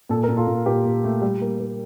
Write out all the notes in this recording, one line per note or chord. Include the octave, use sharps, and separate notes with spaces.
A#2 A4
A#4
A#2
F4 A4
A#2
A#2 G4 A#4
A#2
A3
G3
A#3
A#3